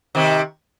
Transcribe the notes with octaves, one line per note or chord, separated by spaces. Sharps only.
C3 D#3